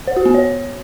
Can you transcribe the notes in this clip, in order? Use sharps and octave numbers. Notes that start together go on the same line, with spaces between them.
C5
F#4
B3
C#5